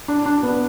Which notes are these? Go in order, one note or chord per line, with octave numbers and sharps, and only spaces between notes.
D4
D4
B3